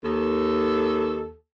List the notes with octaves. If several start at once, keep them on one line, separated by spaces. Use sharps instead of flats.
D#2 A4